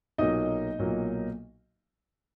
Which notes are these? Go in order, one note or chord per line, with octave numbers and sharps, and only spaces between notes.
B1 A#2 F#3 A#3 D#4 D#5
B1 A#2 F#3 A#3